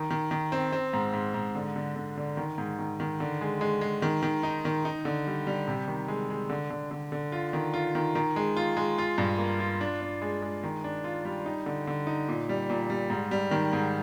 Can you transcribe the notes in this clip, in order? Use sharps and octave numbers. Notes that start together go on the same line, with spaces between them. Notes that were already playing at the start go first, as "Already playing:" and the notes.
Already playing: D#3
D#3
D#3
C4
C4
G#2
G#2
G#2
D3
D3
D3
D3
D#3
G#2
D#3
D#3
D3
G#3
G#3
G#3
D#3
D#3
D#4
D#3
D#4
D3
G3
G3
C3
D#3
G#3
G#3
D3
D3
D3
D3
F4
D#3
F4
D#3
D#3
G#3
F4
G#3
F4
G2
A#3
F4
D4
D4
G#3
G#3
D#3
D4
F4
G3
D#4
D3
D3
D#4
A#2
G3
A#2
G3
G#2
G3
D#3
G#2